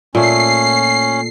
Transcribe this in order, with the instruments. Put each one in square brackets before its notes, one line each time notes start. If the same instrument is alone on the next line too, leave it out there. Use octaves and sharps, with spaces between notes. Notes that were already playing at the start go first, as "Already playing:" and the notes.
[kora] A#2 A3 [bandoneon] C#4 [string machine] C7